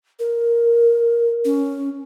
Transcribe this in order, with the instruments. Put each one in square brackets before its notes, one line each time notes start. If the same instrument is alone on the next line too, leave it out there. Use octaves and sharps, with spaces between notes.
[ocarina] A#4
C#4